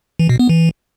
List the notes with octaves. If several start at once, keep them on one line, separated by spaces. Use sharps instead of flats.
E3
B2
B3
E3